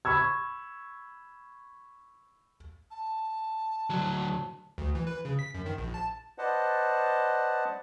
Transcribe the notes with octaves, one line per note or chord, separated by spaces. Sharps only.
B5 C#6 E6 G#6
A5
D2 F#3
D2
E3
B4
C#3
B6
F#2
D#3
A#1
A5
B4 C5 D5 D#5 F#5 A5